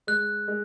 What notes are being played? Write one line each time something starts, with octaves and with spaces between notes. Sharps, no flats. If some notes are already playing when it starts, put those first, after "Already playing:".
G#3 F#6
G#3